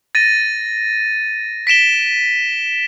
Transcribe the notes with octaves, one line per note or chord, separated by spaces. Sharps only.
A6 A#6 D#7
B6 D7 E7 G7